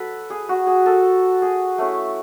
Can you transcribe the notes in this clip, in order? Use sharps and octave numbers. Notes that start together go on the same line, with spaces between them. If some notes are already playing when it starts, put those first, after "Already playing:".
Already playing: F#3 A4 B4
G#4
F#4
G#4
A4
G#4
A3 C#4 E4